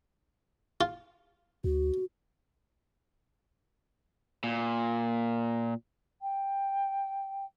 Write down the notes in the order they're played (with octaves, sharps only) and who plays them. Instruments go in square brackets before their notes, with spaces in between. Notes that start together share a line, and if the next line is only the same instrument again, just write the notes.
[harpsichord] F4
[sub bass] D2 [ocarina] F#4
[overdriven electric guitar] A#2
[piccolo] G5